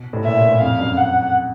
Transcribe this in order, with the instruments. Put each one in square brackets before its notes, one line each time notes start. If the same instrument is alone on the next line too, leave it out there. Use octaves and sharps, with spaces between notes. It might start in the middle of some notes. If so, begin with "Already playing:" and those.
Already playing: [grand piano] B2
A2
[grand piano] A#2 [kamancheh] E5
[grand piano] A#2
A2
[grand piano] F2 [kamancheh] F5
[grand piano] F#2
[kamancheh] F#5